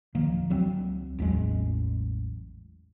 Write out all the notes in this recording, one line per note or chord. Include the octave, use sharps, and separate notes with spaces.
D1 D#3 F3 A#3
C#2 F#3 C4
A1 E2 F#3 G#3